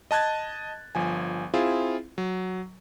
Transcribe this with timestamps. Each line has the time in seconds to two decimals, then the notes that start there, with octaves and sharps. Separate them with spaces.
0.11 D#5 A5 F#6 G#6 A6
0.95 G1 F3 G#5
1.54 C4 E4 F4 G#4
2.18 F#3